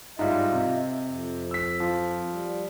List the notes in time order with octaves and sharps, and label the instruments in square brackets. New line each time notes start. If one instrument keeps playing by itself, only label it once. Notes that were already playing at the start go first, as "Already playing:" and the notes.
[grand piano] G#2 G3 [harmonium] F4 D#5 E5
[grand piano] C3
[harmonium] F2
[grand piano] E6 B6
F3
[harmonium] G3